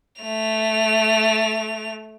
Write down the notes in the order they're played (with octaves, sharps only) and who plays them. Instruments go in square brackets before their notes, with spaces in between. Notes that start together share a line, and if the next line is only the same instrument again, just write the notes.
[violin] A3 F7